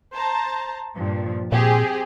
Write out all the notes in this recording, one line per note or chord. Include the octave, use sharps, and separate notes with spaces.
C5 A5 A#5
G2 A#2 F3
A#2 C4 G4 G#4